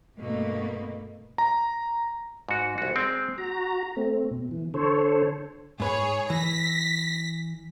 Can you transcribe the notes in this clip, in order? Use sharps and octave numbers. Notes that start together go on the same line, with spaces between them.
G2 B2 A3 A#3
A#5
G#2 F#4
C2 F#4
G#3 C4
F#4 A#5
A3 C4
B2
E3
D3 A4 C5 C#5
G#2 G#4 B4 C#5
E3 A#6 B6